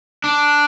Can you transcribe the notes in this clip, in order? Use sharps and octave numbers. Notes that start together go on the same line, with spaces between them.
D4